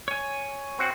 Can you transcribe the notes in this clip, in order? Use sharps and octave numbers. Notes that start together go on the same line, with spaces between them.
C#5 G#5
C4 F#4